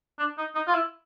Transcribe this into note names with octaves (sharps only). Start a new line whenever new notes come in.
D4
D#4
D#4
F4
E4